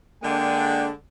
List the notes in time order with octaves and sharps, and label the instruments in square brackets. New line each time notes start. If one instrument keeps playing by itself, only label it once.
[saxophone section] D3 G#3 [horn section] A#3 D4 [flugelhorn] G5